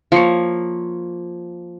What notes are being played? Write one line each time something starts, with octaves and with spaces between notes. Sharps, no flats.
F3 A#3 C#5